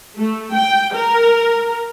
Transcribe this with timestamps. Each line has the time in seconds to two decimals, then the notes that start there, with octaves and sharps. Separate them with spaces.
0.19 A3
0.54 G5
0.95 A#4